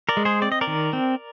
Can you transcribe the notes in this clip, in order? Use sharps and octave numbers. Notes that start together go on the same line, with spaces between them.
A#4 D5
G#3
G#4 C5
C4 D5
D#5
A#4 D5
D#3
C4